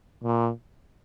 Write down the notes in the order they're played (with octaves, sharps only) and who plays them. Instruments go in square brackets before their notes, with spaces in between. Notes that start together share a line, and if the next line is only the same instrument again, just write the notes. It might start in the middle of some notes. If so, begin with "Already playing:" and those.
[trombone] A#2